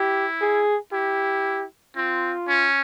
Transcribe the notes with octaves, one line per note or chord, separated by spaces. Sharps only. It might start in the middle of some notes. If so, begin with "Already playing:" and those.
Already playing: E4 G4
G#4
E4 G4
C4 F4
C#4